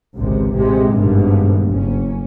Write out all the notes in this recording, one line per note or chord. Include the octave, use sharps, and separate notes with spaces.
G#1 C#2 C3
A1 C3 G#3
G#1 G2 B2
F#1 C#4